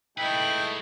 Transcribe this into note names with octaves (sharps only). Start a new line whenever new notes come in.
G#3 A3 D#4 E4 B4 G5